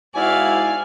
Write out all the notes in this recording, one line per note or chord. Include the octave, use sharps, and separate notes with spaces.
G#2 E4 F#4 D5 F5 G#5